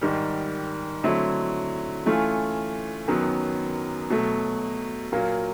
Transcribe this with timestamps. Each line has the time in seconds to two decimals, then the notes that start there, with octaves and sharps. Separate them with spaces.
0.01 G#2 D#3 G3
1.03 D3 F#3 A3 C4 E4
2.06 E3 A3 C#4 F4
3.08 F#2 D#3 F#3 B3
4.10 B2 F#3 A3
5.12 A#2 F#3 A#3